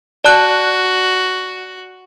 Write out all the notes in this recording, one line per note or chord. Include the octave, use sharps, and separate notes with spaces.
F#4 D5 A5 F#6